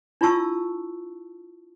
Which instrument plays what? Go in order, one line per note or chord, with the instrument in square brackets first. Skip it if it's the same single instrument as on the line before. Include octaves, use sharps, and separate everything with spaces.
[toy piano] D4 E4 F4 A5 C#6 E6